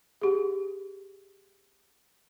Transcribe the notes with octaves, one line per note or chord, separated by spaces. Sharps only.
G4 G#4